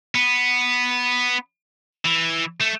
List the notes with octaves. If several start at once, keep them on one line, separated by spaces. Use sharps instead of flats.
B3
E3
A3